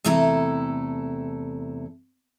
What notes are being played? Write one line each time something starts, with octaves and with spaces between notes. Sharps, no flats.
E2 C3 A3 E4 A4 A#5